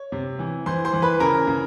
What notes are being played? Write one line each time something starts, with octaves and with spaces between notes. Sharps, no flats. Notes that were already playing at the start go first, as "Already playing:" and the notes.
Already playing: C#5
C3
E3
E3 C5 C6
C5 C6
E3
B4 B5
C#3 A#4 A#5
C#3